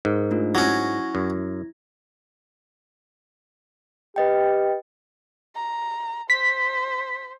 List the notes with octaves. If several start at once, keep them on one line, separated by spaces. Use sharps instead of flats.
G#2 A#4
A3 D4 F4
F#3 C#4 E4 G#6 A#6
F#2
G4 B4 D#5 G5
A#5
C5 B6